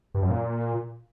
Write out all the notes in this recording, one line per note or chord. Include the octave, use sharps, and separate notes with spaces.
G2
F#2
A#2